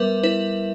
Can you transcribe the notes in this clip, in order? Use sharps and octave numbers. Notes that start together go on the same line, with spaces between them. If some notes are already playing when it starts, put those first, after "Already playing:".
Already playing: G3 B3 A#4 B4 E5
E4 B4